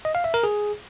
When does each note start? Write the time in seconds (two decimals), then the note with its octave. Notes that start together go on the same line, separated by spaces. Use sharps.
0.05 D#5
0.15 F5
0.24 E5
0.34 A#4
0.44 G#4